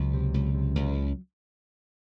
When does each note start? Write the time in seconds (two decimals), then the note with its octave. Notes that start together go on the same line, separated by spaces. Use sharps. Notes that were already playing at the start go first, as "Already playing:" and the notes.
Already playing: C#2 F#3
0.14 C3
0.34 C#2
0.54 C3
0.75 C#2